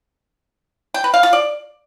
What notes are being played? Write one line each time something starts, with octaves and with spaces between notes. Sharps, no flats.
G5
B4
F5
F4
D5